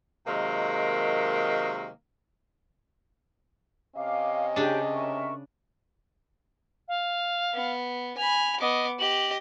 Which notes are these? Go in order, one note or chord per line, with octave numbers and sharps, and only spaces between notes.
C3 D#3 F#3 G#3 A#3
C3 C#4 D#5 F5 D6
C#3 D4 G4 G5
A#4 E5 C#6
F5
B3
G#5 B5 F7
B3 D#5 D6
G4 D#5 F#7